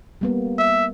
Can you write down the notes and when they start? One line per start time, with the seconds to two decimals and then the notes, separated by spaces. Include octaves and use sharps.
0.21 G3 A#3 B3
0.58 E5